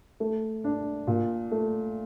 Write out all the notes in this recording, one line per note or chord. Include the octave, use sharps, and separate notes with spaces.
A3
D4
A#2
A3